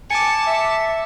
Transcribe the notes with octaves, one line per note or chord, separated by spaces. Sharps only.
G#5 A5 D6 C#7
E5